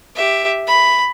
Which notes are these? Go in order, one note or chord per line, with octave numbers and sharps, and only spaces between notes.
G4 E5
B5